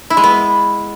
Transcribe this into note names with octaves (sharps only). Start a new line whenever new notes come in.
E4
G#3
B3